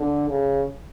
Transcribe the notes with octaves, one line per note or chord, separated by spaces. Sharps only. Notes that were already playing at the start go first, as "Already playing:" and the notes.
Already playing: D3
C#3